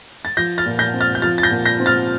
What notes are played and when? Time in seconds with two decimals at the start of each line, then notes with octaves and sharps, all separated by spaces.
0.25 A6
0.37 F3 G6 A#6
0.58 F6 A6
0.66 A#2
0.79 G6 A#6
0.94 C4
1.01 F6 A6
1.15 G6
1.22 F3 F6 A6
1.38 A6
1.43 G6 A#6
1.50 A#2
1.65 G6 A#6
1.80 C4
1.86 F6 A6